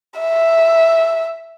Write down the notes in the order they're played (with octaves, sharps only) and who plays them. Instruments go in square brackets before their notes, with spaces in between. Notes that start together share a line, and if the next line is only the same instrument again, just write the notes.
[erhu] E5